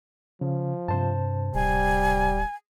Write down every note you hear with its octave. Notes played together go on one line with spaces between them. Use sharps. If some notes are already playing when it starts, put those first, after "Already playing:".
C#3 F3
G2 C3 C5 A5
D1 G3 G#5